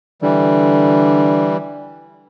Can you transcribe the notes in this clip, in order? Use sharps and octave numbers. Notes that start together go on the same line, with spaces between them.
D3 E3 G3